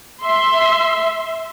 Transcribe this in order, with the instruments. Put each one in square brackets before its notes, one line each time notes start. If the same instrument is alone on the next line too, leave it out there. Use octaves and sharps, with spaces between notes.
[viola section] E5 C6